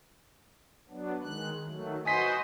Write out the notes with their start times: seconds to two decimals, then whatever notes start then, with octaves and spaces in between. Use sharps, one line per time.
0.89 F#3 B3 D4
1.23 D#3 G#3 F#6
1.66 D#3 F#3 A3
2.06 F#4 B4 C5 D#5 G#5 C6 B6